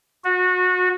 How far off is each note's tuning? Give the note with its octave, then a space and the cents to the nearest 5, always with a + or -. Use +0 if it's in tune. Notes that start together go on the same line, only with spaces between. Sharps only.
F#4 -25